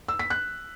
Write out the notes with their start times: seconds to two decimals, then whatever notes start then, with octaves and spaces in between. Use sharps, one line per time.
0.08 E6
0.19 B6
0.30 F#6